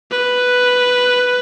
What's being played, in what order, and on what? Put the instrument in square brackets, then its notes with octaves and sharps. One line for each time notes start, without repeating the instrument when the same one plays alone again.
[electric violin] B4